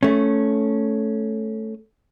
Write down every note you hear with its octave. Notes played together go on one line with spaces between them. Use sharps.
A3 C#4